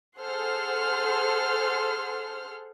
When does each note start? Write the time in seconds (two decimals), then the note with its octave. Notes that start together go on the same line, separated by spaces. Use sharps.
0.19 G#4 A4 C5 F#5 C6 F6